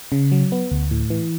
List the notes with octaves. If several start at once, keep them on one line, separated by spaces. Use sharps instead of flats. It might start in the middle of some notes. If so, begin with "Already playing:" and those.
C#3
F#3
B3
D2
A2
E3